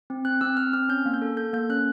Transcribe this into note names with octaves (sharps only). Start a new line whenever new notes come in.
C4
C4 F#6
C4 E6
C4 F6
C4 F6
C#4 G6
A#3
G6
A4
A4 G6
A#3 G6
C#4 F#6